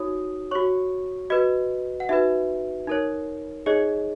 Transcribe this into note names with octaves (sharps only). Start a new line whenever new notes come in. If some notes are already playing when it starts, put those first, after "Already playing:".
Already playing: D#4 F#4 C#5 D#6
F#4 C#5 C#6
F#4 B4 D#5
F#5
D#4 F#4 B4 E5
D#4 A#4 C#5
D#4 G#4 C#5 D#5